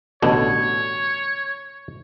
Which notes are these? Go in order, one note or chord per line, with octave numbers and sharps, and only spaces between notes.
A1 B2 D3 C#5